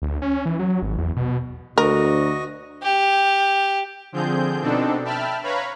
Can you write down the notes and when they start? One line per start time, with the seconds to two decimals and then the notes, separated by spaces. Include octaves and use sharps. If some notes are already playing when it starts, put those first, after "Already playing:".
0.02 D2
0.22 C#4
0.45 E3
0.59 F#3
0.82 G#1
0.98 E2
1.16 B2
1.78 D2 F#4 A#4 D#5
2.82 G4
4.12 D3 F3 C4 G#4 G6
4.61 B2 C4 D4 D#4 A4
5.04 E5 G5 A5 B5 F6
5.43 B4 C#5 F5 A#5 B5 C#6